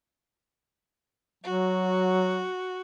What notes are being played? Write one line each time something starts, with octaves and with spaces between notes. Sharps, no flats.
F#3 F#4